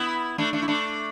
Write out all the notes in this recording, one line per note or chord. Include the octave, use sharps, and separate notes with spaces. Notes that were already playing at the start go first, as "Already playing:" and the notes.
Already playing: B3 E4
A3 D4
A3 D4
E4
A3 D4